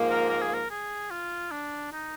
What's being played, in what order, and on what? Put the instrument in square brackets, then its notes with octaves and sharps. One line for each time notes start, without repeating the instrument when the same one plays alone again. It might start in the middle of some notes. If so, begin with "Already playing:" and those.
Already playing: [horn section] G#2 F3 A#3
[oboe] A#4
A#4
G#4
A#4
G#4
F4
D4
D#4